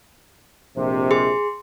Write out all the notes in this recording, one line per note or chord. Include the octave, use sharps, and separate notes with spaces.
A#1 F2 C3
G#4 C6